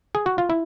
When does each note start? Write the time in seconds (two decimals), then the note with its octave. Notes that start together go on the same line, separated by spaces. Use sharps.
0.15 G#4
0.26 F#4
0.38 F4
0.50 E4